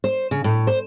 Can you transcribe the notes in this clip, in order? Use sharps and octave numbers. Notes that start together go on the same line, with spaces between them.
C5
C#3
A2
C5